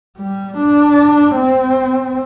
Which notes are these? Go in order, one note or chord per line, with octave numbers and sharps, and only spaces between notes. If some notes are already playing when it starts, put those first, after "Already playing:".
G3
D4
C4